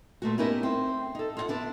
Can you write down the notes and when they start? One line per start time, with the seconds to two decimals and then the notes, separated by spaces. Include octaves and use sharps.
0.22 A#2 A3 F#4
0.38 B3 C#4 D#4 E4 G4 A#4
0.63 C4
1.15 D#4 A4
1.37 F4 D#5 F#5
1.48 B3 D4 E4